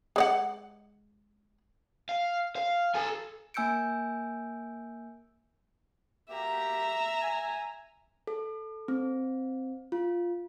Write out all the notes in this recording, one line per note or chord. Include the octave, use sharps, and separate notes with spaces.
G#3 D5 F#5
F5
F5
A4 G#5
A#3 G#5 E6 G6 C#7 D7
A#3 F#4 G4 E5 A#5
G#5
A4
C4
F4